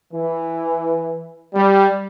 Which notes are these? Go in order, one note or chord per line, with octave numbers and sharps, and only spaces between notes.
E3
G3